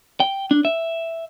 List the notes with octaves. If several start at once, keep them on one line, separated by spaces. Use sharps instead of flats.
G5
D4
E5